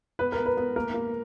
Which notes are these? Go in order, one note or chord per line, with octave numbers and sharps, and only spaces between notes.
B3 B4
A#4
B3
B4
B3
A#3 A#4
A#3